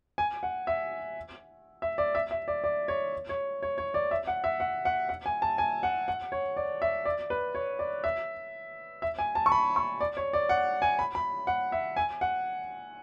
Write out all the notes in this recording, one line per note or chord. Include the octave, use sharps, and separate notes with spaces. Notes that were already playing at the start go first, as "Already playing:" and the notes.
G#5
F#5
E5
E5
D5
E5
E5
D5
D5
C#5
C#5
C#5
C#5
D5
E5
F#5
E5
F#5
F#5
F#5
G#5
A5
G#5
F#5
F#5
C#5
D5
E5
D5
B4
C#5
D5
E5
E5
G#5
A5
C#6
B5
C#6
D5
C#5
D5
F#5
G#5
B5
B5
F#5
E5
G#5
F#5